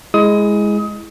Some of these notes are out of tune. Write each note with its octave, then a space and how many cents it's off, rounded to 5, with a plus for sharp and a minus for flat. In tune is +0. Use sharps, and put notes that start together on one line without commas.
G#3 +0 E4 +0 D#6 +25